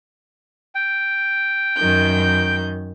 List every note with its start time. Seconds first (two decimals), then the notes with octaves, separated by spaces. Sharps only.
0.75 G5
1.77 F#2 D#3 G6